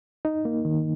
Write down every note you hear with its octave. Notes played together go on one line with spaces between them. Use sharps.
D#4
A#3
D#3